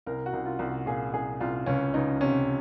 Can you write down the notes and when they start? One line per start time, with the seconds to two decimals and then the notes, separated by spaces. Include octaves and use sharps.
0.06 C2 A#4
0.26 F#4
0.33 C2
0.46 F4
0.59 C2
0.66 F#4
0.86 A#2 G#4
1.13 C2 G#4
1.40 C2 F4
1.66 C#2 C#4
1.94 C#2 D#4
2.21 C3 C#4